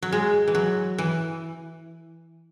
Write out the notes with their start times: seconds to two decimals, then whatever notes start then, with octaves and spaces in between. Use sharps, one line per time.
0.03 F#3
0.13 G#3
0.48 E3
0.55 F#3
0.98 E3